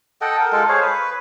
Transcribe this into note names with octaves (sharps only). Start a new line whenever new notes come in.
A4 D#5 F#5 G5
A#4
G#3 F4 A4
G#4 C5 C#5 F5
B4